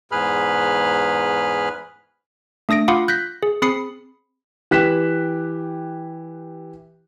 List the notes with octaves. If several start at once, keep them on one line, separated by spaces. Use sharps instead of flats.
E2 G#2 G#4 B4 B5 F6
A3 D4 D#6 A#6 D7
F4 F5 F#5 B5 D6 D#6
F#6 G6 A#6 B6
G#4
C4 G#4 B5 D#6 C7 C#7
E3 G4 F#6 B6 E7